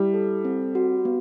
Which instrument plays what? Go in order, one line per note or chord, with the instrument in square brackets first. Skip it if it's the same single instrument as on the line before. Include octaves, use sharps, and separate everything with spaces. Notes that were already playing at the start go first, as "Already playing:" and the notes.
Already playing: [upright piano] G3 [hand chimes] E4
[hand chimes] A4
C4
F#4
B3